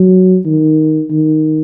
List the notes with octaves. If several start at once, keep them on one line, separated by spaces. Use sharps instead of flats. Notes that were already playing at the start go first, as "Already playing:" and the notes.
Already playing: F#3
D#3
D#3